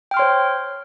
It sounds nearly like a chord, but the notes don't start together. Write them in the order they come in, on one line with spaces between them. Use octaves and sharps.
G5 F6 C6 C#5 C5